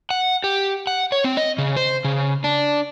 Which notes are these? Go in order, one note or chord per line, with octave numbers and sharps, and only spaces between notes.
F#5
G4
F#5
C#5
C4
D#5
C#3
C5
C#3
D4